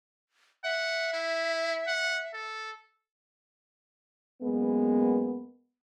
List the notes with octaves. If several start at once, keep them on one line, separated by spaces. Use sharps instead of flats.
E5 F#5
E4
F#5
A4
F#2 G#3 A#3 B3